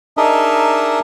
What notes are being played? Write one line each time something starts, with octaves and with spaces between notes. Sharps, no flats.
D4 D#4 G#4 A#4 D#5 E5